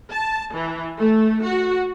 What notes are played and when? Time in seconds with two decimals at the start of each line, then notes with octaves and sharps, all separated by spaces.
0.11 A5
0.54 E3
0.97 A3
1.44 F#4